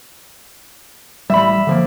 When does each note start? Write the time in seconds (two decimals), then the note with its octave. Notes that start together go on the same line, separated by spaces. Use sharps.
1.30 A1 G3 E5 B5
1.67 D3 F3 A#3